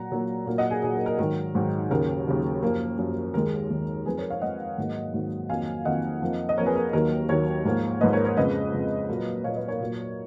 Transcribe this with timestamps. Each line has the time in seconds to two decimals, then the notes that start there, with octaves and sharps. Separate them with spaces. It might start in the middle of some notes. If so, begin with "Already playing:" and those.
Already playing: A#2 F#3 A#3 F#5 A#5
0.11 A#2 F#3 A#3
0.46 A#2 F#3 A#3
0.58 D#5 F#5
0.71 G#4
0.82 A#2 F#3 A#3 G#4
0.95 A#4
1.06 A#4
1.18 G#2 D#3 F#3 A#4
1.55 G#2 D#3 F#3
1.90 D#2 C#3 F#3 A#4
2.27 D#2 C#3 F#3
2.62 F#2 F3 A#3 A#4
2.98 F#2 F3 A#3
3.34 D#2 D#3 G#3 A#4
3.70 D#2 D#3 G#3
4.06 F2 F3 G#3 G#4 B4
4.18 A#4 C#5
4.30 C#5 F5
4.41 F2 F3 G#3 D#5 F#5
4.78 G#2 D#3 F#3 A#3
5.14 G#2 D#3 F#3 A#3
5.49 F2 D#3 F#3 A#3 F5 G#5
5.85 F2 D#3 F#3 A#3 D#5 F#5
6.22 F2 F3 A#3
6.49 D#5
6.57 F2 F3 A#3 A#4 C#5
6.66 G#4 B4
6.76 A#4
6.93 D#2 D#3 F#3 A#3 A#4
7.29 D#2 D#3 F#3 A#3 A#4 C#5
7.65 G#2 F3 A#3
8.01 G#2 F3 A#3 B4 D#5
8.13 A#4 C#5
8.25 A#4 C#5
8.36 F2 C#3 G#3 B4 D#5
8.73 F2 C#3 G#3
9.09 A#2 F#3 A#3
9.44 A#2 F#3 A#3 C#5 F5
9.56 B4 D#5
9.68 A#4 C#5
9.80 A#2 F#3 A#3